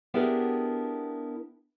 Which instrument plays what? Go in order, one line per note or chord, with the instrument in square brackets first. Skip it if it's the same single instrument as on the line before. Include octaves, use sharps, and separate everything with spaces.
[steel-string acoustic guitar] B3 D4 E4 G4 G#4 A#4